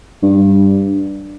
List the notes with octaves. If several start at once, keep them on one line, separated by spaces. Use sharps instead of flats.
G2